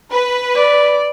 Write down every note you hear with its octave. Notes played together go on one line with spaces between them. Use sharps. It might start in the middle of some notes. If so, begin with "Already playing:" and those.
B4
D5